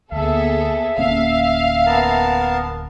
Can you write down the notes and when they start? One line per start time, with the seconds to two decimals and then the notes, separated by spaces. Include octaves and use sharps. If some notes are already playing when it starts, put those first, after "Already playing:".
0.12 D2 A#3 B3 G#4 A4 E5
0.98 D1 A#3 C#4 F5
1.86 B3 A#4 A5